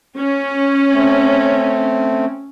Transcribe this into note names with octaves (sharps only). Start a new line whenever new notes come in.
C#4
A3 C4